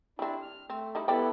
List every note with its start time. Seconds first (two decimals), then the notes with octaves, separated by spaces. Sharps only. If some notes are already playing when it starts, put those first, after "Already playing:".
0.19 G3 C4 D4 E4
0.42 F6
0.70 A3 C4
0.95 G3 D#4 E4
1.08 G3 B3 E4 A4 D5 G5